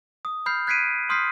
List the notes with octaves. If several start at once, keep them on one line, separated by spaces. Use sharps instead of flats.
D#6
B5 F6 G6 C7
F#6 G#6 B6 C7 D7 D#7
C6 D#6 F6 G6 B6 C7